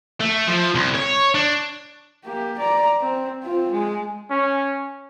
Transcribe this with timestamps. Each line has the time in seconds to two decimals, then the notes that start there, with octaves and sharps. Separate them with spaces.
0.20 A3
0.47 F3
0.75 C2
0.95 C#5
1.35 D4
2.24 A#3 G4
2.59 D5 A#5
3.01 C4
3.43 C4 F4
3.72 G#3
4.31 C#4